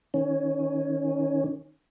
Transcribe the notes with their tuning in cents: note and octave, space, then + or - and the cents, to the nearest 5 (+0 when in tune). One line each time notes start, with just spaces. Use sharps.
D#3 +0 C#4 +0